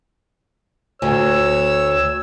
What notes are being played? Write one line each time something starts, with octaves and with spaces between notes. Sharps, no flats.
D2 C#5 E6